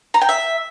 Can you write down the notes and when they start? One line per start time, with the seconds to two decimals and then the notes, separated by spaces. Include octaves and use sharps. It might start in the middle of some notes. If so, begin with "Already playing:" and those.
0.14 A#5
0.21 G5
0.29 E5